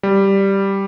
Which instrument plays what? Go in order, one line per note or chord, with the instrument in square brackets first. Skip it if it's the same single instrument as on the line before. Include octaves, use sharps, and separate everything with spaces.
[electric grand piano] G3